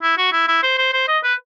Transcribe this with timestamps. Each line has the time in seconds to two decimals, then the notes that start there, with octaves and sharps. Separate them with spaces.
0.02 E4
0.18 F#4
0.32 E4
0.48 E4
0.63 C5
0.78 C5
0.93 C5
1.08 D#5
1.23 B4